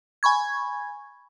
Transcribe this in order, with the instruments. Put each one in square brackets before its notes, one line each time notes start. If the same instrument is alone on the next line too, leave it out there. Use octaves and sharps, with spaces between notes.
[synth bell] G#5 B5 C#6 G#6